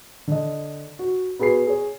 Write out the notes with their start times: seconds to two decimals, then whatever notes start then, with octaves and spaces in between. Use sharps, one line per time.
0.28 D3 D#5
0.99 F#4
1.39 B3 F#4 G#4 B5 C7
1.67 G#4 C#5